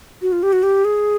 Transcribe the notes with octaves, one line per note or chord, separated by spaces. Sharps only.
F#4
F4
G4
F#4
G4
G#4